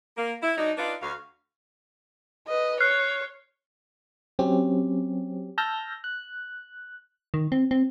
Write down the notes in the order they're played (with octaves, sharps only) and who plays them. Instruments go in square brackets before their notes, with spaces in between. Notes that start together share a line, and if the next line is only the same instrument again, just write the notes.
[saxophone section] A#3
E4
F#3 D4 D#4
D4 D#4 F4 B4 D5
D2 F#4 F5
[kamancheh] B4 D#5
[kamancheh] C#5 [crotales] F6 F#6 C7
[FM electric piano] F#3 C4 C#4 G4
A5 E6 F6 G6 A#6
F#6
[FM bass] D#3
C4
C4